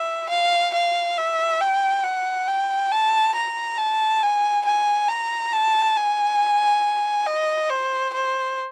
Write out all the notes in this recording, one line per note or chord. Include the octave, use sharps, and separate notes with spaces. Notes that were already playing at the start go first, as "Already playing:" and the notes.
Already playing: E5
F5
F5
E5
G5
F#5
G5
A5
A#5
A5
G#5
G#5
A#5
A5
G#5
D#5
C5
C5